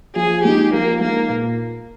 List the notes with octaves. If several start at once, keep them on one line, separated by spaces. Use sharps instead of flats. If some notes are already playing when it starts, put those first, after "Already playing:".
F3 G#4
G#3 D#4 G4
F3 A#3
G#3 A#3 D#4
A#2